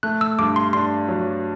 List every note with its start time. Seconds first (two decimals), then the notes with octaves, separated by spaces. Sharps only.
0.03 A3 F#6
0.21 E6
0.39 G2 D6
0.56 C6
0.73 D4 C6
1.08 F#3